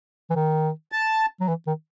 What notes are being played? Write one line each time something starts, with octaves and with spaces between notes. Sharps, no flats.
E3
D#3
A5
F#3
E3
D#3